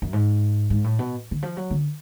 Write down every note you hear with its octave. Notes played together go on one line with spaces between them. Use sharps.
F#2
G#2
G#2
A2
B2
D3
F3
F#3
D3